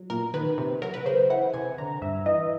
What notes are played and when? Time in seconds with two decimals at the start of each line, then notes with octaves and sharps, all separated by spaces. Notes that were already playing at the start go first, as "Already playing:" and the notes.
Already playing: F#3
0.10 A#2 A#4
0.34 D#3 B4
0.58 C3
0.82 F#3 A#4
0.94 B4
1.06 C#3 C5
1.30 E3 F#5
1.54 C3 G#5
1.78 D3 A#5
2.02 G2 E5
2.26 E3 D#5